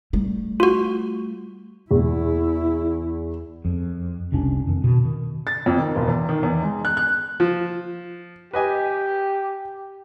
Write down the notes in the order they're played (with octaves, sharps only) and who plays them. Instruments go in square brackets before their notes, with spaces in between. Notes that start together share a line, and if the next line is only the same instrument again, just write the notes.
[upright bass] G3 A3
[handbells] F4 F#4
[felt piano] E2 [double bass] E4
[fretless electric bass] F2
F1 C2 C#4 D4
F2 D#3
B2
D#3
[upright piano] A6
F2
D#3
E1
E2
D#3
E2
G#3
F#6
F#6
[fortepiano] F3
[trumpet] G4 [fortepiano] B4 D#5 G#5